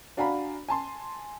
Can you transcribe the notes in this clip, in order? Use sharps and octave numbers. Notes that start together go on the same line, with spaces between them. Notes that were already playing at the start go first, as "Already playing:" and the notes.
D4 F#4 F5 G#5 A#5 B5
G#5 A5 C6